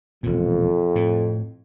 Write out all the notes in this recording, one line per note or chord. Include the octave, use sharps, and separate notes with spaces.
E1 F2 A#2
A2